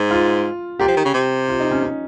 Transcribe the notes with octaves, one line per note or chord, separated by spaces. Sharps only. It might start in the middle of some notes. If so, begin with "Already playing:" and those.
Already playing: G#2
F4
A#2 G4
F3
D#3
C#3
C3
F4
D#4
C#4
C#4